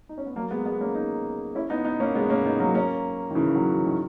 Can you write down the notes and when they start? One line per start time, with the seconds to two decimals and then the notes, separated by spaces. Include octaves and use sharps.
0.09 D#4
0.18 C#4
0.26 B3
0.36 F#3 A#3
0.51 G#3 B3
0.66 G#3 B3
0.81 A#3 C#4
0.95 B3 D#4
1.55 C#4 E4
1.70 B3 D#4
1.85 B3 D#4
2.00 A#3 C#4
2.15 G#3 B3
2.30 A#3 C#4
2.45 B3 D#4
2.60 F#3 A#3
2.74 A#3 C#4
3.31 D#3
3.35 C#3 E3
3.54 D#3 F#3
3.75 E3
3.87 D#3